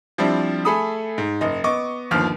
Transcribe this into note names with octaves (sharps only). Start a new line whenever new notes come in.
F3 G3 C4 D4 E4
A3 G#4 A4 B5 D#6
G#2
F#1 D#5
B3 D#5 C#6 D6
G1 D#2 F3 F6